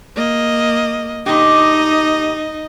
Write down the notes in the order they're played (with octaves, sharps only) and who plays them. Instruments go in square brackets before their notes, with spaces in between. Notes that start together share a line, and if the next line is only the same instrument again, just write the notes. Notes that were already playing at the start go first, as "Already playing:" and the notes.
[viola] A#3 D#5
[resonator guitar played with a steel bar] A#2 D3 G4 [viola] D#4 D#5